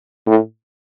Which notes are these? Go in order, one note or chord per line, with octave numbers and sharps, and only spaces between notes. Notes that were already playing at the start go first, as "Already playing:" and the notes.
A2